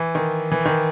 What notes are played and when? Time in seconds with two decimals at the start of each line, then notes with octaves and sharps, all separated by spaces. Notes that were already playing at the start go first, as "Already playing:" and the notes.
Already playing: E3
0.15 D#3
0.52 E3
0.65 D#3